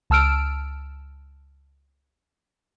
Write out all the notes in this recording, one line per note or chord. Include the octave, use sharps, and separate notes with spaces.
C#2 A5 E6 F6 D7